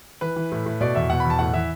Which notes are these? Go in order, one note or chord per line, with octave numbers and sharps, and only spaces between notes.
E3 B4
E3
A2
A2
B2 D5
E2 E5
B2 F#5
E2 B5
A5
A2 F#5
E3 E5